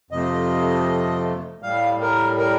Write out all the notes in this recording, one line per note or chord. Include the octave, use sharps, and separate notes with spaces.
F2 C3 F3 A3 D#5
A2 G3 F5
A#4
A#4